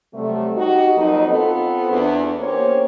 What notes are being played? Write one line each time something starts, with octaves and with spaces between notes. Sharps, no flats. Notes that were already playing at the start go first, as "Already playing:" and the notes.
C3 F#3 G3 A3
D#4 F#4 G4
F2 F#3 A#3 D#4
B3 C4 F4 A4
E2 D4
A#3 B3 C#4 G4 C5 C#5